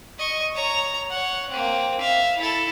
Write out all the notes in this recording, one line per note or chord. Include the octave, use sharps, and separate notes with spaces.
D#5 C#6
C#5 A#5
C#5 F#5
A#3 C4
E5 F5
E4 A4